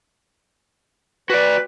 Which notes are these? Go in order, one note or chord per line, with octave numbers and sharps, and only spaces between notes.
F#4 B4 D5